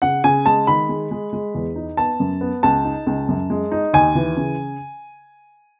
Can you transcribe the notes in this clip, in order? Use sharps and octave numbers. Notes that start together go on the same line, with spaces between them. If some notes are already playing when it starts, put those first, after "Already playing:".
C#3 F#5
C#3 G#5
G#3 A5
D#3 B5
G#3
G#3
G#3
E2
D#4
B3 A5
F#2
B3
C#2 A5
D#4
C#2
F#2
G#3
D#4
D#2 G#5
E3
C#3